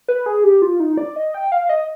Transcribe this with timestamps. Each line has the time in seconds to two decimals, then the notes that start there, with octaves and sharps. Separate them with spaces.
0.08 B4
0.26 G#4
0.44 G4
0.62 F4
0.80 D#4
0.98 D5
1.16 D#5
1.34 G5
1.52 F5
1.69 D#5